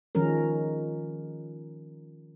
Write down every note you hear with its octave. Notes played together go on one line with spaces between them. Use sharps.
D#3 F3 G#3 C#4 A#4